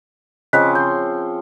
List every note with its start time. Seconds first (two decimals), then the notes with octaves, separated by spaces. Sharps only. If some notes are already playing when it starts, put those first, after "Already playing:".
0.53 C#3 F3 C4 D#5 F#6 B6
0.75 C6 G6